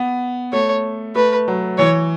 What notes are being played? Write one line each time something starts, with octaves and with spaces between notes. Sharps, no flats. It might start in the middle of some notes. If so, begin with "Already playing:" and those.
Already playing: B3
A3 C#5
A3 B4
F#3
E3 C#5